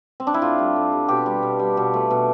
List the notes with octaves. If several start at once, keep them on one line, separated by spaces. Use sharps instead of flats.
C4
D4
E4
A2 F4
G3
A2
G3
B2 G4
G3
B2
G3
B2
A3
B2